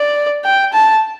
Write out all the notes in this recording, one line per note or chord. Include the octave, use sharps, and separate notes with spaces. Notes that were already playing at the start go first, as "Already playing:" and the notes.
Already playing: D5
G5
A5